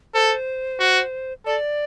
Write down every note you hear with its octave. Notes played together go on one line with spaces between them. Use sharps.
A4 C5
F#4
A4 D5